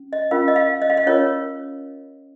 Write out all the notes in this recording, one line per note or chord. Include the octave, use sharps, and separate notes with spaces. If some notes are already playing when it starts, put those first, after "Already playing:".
Already playing: C#4
D#5
C#4 F4 A#4 F5
D#5
F5
D#5
F5
D#5
C#4 F4 A#4 C#5